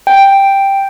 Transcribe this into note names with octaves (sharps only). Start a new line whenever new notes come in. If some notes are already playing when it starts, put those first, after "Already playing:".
G5